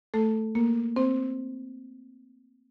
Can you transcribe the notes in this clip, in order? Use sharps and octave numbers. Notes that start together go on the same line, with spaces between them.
A3 A4
A#3 A#4
C4 C5